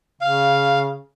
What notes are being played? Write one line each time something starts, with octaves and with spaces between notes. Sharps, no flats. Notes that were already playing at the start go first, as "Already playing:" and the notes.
C#3 F5